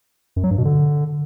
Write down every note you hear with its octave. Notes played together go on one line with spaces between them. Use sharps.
F#2
F#3
G2
B2
D3